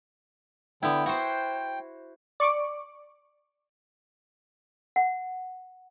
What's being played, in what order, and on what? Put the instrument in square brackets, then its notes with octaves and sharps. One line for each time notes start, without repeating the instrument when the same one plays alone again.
[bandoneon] D3 G5 [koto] B3 E4
[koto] F#4 C5 [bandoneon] G5
[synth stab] D5 C#6 D6
[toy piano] F#5